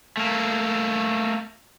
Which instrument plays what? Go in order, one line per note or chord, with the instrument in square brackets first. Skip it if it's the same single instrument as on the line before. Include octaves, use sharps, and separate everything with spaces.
[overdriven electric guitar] A3 A#3